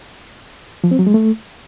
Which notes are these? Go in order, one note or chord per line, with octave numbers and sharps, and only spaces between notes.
F3
C4
F#3
G#3
A3